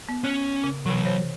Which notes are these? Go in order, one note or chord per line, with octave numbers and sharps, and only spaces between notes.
B3
C#4 C#5 F#6
C#3
C3 E3 F#3 B4
C5 C#5